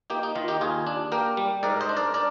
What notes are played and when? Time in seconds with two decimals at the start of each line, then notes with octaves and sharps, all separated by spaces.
0.10 A#3 D#4 G4
0.23 D#4
0.35 D#3 F4
0.48 D#4 G4
0.61 D#2 F4 G#4
0.87 D4
1.12 A#3 G4 A#4
1.37 G3
1.63 G#2 A#4 D5
1.81 C5 D#5
1.89 D4
1.97 A#4 D5
2.14 D4 A#4 D5